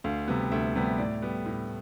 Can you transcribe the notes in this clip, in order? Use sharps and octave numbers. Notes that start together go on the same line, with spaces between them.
D2 F5
C3 G3 B3
D2 E5
C3 G3 B3
A2 D5
G3 B3
A2